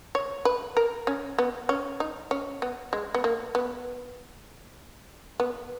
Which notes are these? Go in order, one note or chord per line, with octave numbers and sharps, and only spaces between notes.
C#5
B4
A#4
C#4
B3
C#4
D#4
C#4
B3
G#3
B3
A#3
B3
B3